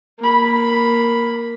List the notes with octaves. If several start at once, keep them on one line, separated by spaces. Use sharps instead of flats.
A#3 B5